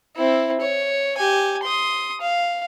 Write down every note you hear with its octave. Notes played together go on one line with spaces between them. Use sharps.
C4 E4
C#5
G4 G#5
C6 D#6
F5